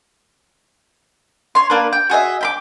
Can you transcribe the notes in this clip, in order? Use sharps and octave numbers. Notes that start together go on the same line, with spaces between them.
C#5 C6
A#3 D4 B4
G5
F#4 G#4 D#5 E5
G5 B5 D6